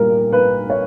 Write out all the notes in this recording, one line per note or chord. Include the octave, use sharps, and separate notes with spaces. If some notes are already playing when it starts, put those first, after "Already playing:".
Already playing: A#2 G3 A#4
B4
C#5